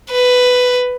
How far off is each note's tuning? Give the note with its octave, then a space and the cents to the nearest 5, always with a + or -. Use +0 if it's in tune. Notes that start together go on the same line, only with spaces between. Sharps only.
B4 +10